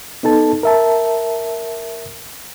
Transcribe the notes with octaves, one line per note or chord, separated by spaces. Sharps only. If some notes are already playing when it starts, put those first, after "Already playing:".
B3 D#4 A4 A5
A#4 E5 A5